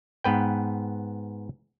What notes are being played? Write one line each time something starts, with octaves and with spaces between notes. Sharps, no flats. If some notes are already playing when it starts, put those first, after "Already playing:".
G#2 B3 B4 G5